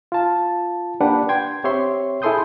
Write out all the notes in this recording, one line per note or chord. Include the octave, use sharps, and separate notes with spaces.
F4 A5
A#3 D4 G4 B4 F#5
G5 C6 G#6
C4 G4 C#5 E5 C6
E4 G#4 A4 C6 D#6 G6